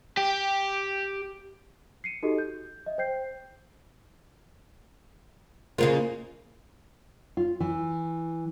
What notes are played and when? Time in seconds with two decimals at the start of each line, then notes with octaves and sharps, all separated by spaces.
0.17 G4
2.04 C7 C#7 D#7
2.23 D#4 F#4 G4 A4 D#5
2.38 G6
2.86 D#5 E5
2.98 C5 G5 G6 C7
5.78 C#3 A#3 F4 G#4 A#4 C5
7.37 F4
7.60 E3